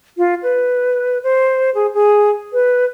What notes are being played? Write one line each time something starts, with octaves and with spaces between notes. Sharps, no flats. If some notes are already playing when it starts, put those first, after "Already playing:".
F4
B4
C5
G#4
G#4
B4